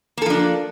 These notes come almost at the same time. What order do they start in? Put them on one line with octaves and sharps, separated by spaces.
A#3 A4 F3 D4